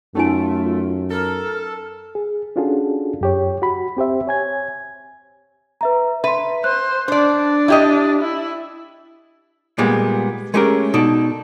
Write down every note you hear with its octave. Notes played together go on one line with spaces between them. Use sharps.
F#2 A3 C#4 D#4 F4 G#5
A4 A#4
G#4
C#4 D4 F4 F#4 G#4 A4
F#2 G4 C#5
F#4 B5
C4 G4 C5 E5
C#5 G#5 G#6
B4 E5 A#5
B4 E5 C6
C5 F#6
D4 C5 D5
E4 G4 D#5
E4
A#2 G3 G#3 B3
G#3 A3 C#4 G4 G#4 A#4
B2 D#4 A4 D5